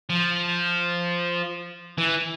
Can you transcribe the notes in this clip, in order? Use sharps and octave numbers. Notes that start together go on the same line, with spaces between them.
F3
E3